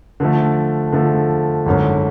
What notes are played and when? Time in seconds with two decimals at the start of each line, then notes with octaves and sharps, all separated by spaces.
0.20 D3 F3 A3
0.92 D3 F3 A3
1.66 G#1 F#2 D3